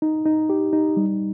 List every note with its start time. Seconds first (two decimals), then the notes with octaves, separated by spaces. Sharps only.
0.02 D#4
0.26 D#4
0.50 G4
0.73 D#4
0.97 G3